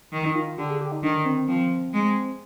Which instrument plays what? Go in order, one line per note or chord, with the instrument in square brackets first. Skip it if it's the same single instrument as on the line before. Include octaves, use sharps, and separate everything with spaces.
[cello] D#3
[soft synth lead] D#4
F4
[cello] D3 [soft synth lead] G4
[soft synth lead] G#4
G4
D#4
[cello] D#3 [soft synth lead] D4
[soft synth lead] C4
[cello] F3 [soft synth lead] C4
[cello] G#3